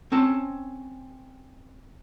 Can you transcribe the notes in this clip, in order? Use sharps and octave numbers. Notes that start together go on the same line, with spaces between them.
C4 C#4 A5